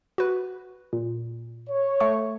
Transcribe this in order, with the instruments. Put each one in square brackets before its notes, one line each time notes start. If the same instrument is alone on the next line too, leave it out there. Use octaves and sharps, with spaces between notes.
[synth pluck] F#4 B4
A#2
[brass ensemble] C#5
[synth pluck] A3 C#6